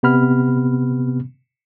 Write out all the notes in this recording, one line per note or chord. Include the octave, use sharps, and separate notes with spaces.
C3 B3 B5 F6